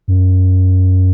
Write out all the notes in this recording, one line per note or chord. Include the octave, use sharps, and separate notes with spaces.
F#2